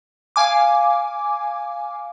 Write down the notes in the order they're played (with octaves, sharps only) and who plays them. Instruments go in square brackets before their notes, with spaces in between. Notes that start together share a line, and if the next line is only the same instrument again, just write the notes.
[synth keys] F5 G#5 D6